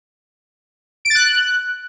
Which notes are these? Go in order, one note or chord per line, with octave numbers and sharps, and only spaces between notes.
D7
A6
F#6